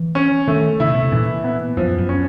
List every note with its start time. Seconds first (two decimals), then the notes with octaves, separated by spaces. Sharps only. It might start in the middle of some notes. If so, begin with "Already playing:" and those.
Already playing: E3
0.15 C#4
0.47 D#3 A3
0.80 C#3 E4
0.87 C3
0.95 B2
1.03 C3
1.12 A#2 E3
1.44 B3
1.77 F#2 F3
1.98 F#2
2.09 C#4